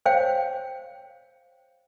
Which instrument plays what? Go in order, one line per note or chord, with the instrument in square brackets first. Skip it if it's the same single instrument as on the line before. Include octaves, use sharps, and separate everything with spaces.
[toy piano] C5 C#5 F5 G5